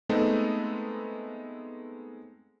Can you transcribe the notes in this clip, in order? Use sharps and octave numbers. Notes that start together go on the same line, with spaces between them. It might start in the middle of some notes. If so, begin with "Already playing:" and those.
G#3 A3 B3 C4 D#4 A4